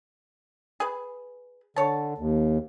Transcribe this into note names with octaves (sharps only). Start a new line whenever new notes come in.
G#4 B4
D3 C#5 A5
D#2